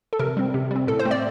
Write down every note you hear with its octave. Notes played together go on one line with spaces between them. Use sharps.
A4
C3 A#4
G3 C4
C3
G3 C4
A2 A4
C5
A3 C4
D5